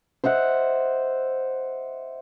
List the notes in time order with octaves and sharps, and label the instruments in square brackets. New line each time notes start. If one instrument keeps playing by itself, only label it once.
[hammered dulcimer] C5 D#5 E5 F#5